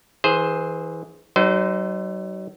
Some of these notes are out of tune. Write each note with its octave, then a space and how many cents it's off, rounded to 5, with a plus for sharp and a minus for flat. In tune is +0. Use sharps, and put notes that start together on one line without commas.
E3 -25 G#4 +0 C5 +0
F#3 +40 D#4 +0 C5 -35